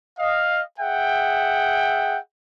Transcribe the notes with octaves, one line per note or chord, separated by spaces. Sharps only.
D#5 F5
G#4 E5 F#5 G5